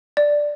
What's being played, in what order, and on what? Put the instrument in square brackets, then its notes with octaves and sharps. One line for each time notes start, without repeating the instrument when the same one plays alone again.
[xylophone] D5